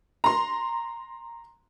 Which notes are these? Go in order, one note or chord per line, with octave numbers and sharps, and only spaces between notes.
A#5 C6